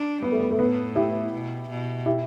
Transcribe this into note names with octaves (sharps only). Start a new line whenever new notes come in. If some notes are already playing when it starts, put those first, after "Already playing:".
Already playing: D4
G3 B3
A3
B3
A3
A2 B3
E4 G4
B2
B2
E4 G4